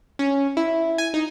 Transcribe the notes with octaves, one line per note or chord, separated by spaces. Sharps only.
C#4
E4
G#5
D#4